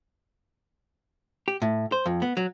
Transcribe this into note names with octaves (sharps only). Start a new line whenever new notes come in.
G4
A2
C5
F2
B3
F#3